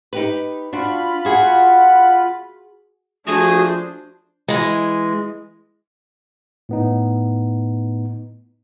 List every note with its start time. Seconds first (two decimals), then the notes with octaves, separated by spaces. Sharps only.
0.13 D#4 G4 B4
0.73 D4 F4 F#4 B5
1.25 F#4 G#4 F#5
3.27 F3 A3 D4 F#4 G#4 C5 D#6
4.48 E3 G#3
6.69 A2 B3 D#4